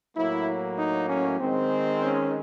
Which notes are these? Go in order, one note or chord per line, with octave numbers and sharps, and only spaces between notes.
A2 F#3 A#3 E4
D#4
C#4
D#3 G#3 C4
C#4